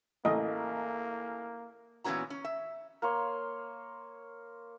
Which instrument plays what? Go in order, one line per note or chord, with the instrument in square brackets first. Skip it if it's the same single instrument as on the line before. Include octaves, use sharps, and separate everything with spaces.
[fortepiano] A1 [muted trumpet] A#3 [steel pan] D#5
[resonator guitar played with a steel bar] A#2 E3 B3 C#4 F#4 A#5
C#4
E5
[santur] A#3 C#5 C6